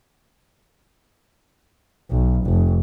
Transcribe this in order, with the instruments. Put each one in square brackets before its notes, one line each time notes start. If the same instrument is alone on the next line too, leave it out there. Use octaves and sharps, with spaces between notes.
[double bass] B1
F1